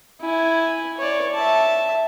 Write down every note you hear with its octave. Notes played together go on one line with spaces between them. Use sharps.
E4 G#5
C#5 D5
E5 A5